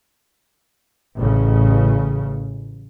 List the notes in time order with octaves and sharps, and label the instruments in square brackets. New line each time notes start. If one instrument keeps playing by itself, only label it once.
[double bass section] A1 C#3